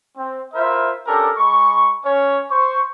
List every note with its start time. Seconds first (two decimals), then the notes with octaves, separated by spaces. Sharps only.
0.18 C4
0.55 E4 F4 A#4 C5 E5
1.06 C#4 D4 G4 A4 A#4
1.37 G#3 B5 C#6
2.05 C#4 C#5
2.51 C5 C#6